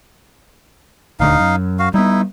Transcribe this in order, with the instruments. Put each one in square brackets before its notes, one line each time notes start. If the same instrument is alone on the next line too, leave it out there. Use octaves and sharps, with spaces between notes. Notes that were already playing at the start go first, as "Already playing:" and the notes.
[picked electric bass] D#1 D2 D3 [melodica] D#4 F5
[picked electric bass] F#2
[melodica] F#4 F5
[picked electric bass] G3 B3 [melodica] D#4 E4